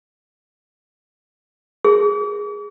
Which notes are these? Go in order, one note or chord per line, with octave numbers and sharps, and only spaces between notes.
G#4